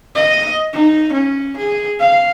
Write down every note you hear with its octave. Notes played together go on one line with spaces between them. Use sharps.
D#5
D#4
C#4
G#4
F5